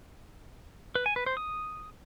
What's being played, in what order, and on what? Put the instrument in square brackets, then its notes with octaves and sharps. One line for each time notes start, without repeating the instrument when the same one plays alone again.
[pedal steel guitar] B4
G#5
B4
C5
D#6